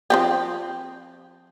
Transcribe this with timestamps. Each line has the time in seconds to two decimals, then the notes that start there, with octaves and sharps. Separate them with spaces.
0.10 F3 C4 G4